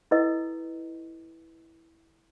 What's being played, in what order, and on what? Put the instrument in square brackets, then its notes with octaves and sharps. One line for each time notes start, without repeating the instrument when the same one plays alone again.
[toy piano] E4 A4 B4 D#5